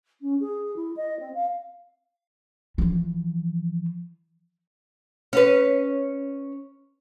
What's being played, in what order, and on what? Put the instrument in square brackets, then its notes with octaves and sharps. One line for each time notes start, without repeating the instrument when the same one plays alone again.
[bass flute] C#4
G#4
E4
D#5
C4
F5
[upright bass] E3 F3
[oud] C#4 B4